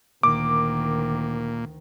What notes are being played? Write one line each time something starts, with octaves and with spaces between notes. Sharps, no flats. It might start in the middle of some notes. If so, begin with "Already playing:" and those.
D2 A#2 D#3 D6